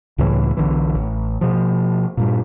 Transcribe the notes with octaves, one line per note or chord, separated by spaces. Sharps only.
C#2 A2 C#3 E3
B1 D3 E3
A1
B2 F3
G2 A#2